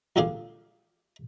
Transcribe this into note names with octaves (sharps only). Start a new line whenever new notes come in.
C#2 A#2 D3 G4 G#4 F5